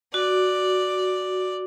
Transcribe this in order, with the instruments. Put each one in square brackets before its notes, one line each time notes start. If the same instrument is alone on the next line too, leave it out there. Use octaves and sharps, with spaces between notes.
[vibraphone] F#4 [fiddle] D5